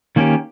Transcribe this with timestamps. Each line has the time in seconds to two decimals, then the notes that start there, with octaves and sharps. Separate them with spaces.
0.16 D#3 A#3 C#4 G4